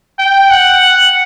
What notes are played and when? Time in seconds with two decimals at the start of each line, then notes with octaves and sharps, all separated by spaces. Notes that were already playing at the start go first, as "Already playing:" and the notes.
0.19 G5
0.50 F#5